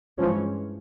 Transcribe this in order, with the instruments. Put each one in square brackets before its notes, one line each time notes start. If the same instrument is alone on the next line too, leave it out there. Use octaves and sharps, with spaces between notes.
[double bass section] G2 E3 G#3 C#4 [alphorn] F3